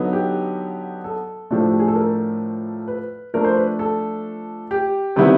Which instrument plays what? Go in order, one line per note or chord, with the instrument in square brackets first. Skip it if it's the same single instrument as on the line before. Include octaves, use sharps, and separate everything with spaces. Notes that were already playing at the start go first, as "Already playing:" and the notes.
Already playing: [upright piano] D3 F#3 B3 D#4
G4
A4
A2 F3 A3 D4
G4
G#4
A4
A#4
B4
F3 A3 D4 A#4
C5
B4
A4
G4
C3 D#3 G3 B3 E4